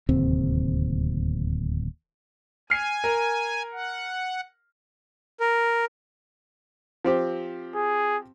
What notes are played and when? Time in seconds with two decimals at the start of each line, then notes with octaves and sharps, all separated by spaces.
0.09 D1 D#2 C3 C4
2.70 G#5 F6 C7 D#7
3.04 A#4
3.72 F#5
5.40 A#4
7.05 F3 C4 G4
7.75 G#4